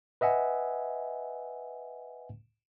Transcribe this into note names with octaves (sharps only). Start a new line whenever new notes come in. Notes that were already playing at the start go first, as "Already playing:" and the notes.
B4 D#5 E5 F#5 G#5